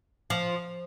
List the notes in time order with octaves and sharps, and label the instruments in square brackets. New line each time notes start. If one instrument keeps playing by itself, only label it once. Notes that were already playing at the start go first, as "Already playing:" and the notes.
[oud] F3